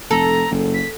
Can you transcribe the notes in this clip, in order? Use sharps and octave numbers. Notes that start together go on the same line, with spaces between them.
F1 A4 A#5
F#1
B6